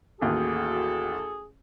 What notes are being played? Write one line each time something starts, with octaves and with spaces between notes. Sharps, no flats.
A1 D#2 F#4 G#4 A4